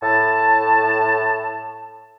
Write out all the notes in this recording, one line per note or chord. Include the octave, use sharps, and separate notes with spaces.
A2 A5